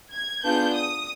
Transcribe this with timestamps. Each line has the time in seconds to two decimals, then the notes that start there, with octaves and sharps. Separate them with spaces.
0.13 G#6
0.44 B3 D4 F4 G#4 G6
0.75 D#6